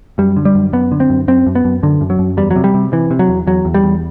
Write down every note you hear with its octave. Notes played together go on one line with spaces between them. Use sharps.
F#2 G3
D3
G3
F#2
F#2 B3
D3
C4
F#2
F#2 C4
F#2
B3
F#2
F#2 D3
F#2
F#3
F#2
E2 G3
F#3
C3
G3
C3
C3 E3
C3
F#3
E2
E2 F#3
E2
G3
E2